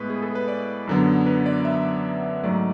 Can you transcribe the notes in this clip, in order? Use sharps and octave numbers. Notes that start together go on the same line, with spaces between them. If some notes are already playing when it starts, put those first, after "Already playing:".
Already playing: A2 G#3 B3 B4
G#4
A4
B4
D5
F#2 D3 F#3 B3
B4
D5
E5
G#2 F#3 A3 D5